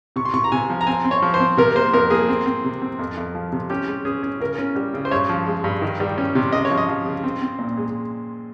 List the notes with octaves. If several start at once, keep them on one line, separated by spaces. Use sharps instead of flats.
C3 C#6
C6
C3 C#6
A#5
C3 G#5
F3
A#5
C4 G#5
C4
C#5
F3
C5
C4
C3 A#4
A#3 C5
F2 A#4
A#3 G#4
C4
C4
C3
C4
F2
F2
F3
C3
C#4 G4
G#3
C#4 G#4
C#4
C#3 A#4
C#4
G3
C#3
C5
G2 C#5
F3
G#3
G2
D#3
G3
C#4
C3
C#3 D#5
C#5
F3
D#5
F3
C#3
C4
C4
A#2
G#3